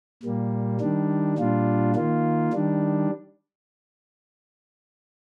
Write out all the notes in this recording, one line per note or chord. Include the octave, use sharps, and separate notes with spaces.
A#2 G3 A#3
D#3 G3 D4
A#2 G3 D4 F4
D#3 A#3 F4
D#3 G3 D4